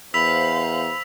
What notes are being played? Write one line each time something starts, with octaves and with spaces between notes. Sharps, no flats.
E2 C5 F5 B5 E6 B6 F7